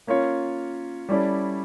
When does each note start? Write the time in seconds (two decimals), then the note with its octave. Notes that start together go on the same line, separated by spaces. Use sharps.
0.07 A#3 C#4 F4 C#5
1.09 G3 C#4 E4 A4 D5